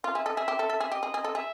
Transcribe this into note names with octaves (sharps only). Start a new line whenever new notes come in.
F4 F5
G#4 E5
A4 D#5
G#4 E5
G4
A4
A4
G#4
G4 D#5
G#4
G#4
A4
G#4 E5